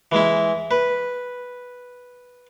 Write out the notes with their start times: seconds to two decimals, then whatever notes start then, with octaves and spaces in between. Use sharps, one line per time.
0.12 E3 G#3 E4
0.71 B4